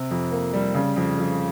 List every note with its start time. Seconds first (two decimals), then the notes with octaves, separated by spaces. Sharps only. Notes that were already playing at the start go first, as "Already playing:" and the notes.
Already playing: C3
0.11 F2
0.32 A#3
0.53 G3
0.75 C#3
0.96 F2
1.18 F2